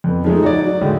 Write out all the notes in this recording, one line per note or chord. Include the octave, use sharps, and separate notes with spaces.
F2 B3
F3 G#3 A3 D#4
F#4 C#5 D5
F#3
D2 A2 D#3 G#3